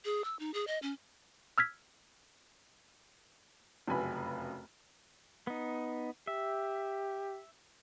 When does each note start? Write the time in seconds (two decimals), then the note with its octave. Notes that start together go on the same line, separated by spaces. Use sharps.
0.05 G#4
0.24 E6
0.39 D#4
0.54 G#4
0.67 D#5
0.82 C#4
1.58 E6 F6 G#6 B6
3.88 F1 F#2 C#3 B4 G#5 B5
5.47 B3 D#4
6.27 G4 E5